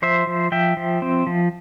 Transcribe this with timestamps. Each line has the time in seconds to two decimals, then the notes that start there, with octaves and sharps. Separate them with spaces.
0.02 F3 C5 E5
0.27 F3
0.52 F3 E5 G5
0.77 F3
1.02 C4
1.27 F3